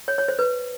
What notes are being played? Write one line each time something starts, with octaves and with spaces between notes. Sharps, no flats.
C#5
C#5
C5
B4